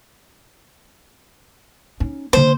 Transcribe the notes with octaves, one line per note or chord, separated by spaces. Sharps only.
C#4 D#4
D3 A#3 C5